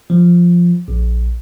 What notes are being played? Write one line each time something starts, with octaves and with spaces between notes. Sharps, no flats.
F3
A#1